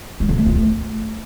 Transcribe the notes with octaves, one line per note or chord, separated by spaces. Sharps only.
G#3
D3
A3
F4
A3